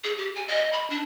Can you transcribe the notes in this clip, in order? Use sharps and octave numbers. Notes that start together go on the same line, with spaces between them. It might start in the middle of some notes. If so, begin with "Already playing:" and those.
G#4
G4
G#5
D#5
B5
D4